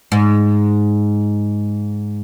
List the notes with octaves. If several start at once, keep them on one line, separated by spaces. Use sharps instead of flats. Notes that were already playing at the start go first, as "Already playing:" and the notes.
G#2